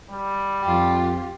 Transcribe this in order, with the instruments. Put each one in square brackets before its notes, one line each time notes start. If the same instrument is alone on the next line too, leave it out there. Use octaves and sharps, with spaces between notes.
[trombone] G3
[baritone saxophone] F2 [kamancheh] F4 G4